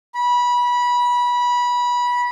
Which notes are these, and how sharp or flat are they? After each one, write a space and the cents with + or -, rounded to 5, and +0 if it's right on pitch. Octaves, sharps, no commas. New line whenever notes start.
B5 -20